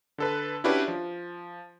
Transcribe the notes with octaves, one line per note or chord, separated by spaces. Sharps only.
D3 A4 B4
C#4 D4 E4 F#4 G4 B4
F3